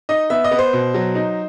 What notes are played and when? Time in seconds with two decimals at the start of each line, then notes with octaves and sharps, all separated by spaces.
0.09 D#4 D#5
0.30 B3 E5
0.44 D#5
0.51 B3
0.59 C5
0.73 B2
0.94 F#3
1.15 D#4